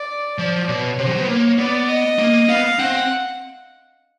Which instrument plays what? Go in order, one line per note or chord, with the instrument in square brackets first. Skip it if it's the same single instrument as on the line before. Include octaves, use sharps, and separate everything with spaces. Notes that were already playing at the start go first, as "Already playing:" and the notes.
Already playing: [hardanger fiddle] D5
[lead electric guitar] F3 [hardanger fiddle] D5
[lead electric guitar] B2 [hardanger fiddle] C#5
[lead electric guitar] C3 [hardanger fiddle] C5
[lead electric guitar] F#3
B3
[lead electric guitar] A#3 [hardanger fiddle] C#5
[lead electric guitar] B3 [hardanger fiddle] D5
[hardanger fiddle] D#5
[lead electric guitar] A#3
[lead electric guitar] B3 [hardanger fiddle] F5
[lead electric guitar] C4 [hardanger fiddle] F#5